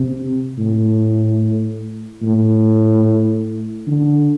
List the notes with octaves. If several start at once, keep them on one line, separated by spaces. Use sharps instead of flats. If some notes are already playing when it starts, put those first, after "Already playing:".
Already playing: C3
A2
A2
D3